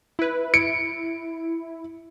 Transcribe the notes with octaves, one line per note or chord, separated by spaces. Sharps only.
E4 B4
E4 C#7 D7